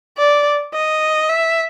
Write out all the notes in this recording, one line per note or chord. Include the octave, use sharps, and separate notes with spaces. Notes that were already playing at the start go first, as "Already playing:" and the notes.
D5
D#5
E5